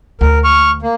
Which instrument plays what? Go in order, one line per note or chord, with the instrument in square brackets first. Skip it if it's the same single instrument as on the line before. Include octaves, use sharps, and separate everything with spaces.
[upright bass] D2 [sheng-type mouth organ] A#4
[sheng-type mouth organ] C#6 F6
A#3